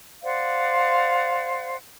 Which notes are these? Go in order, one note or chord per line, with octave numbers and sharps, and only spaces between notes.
C5 D5 F5 F#5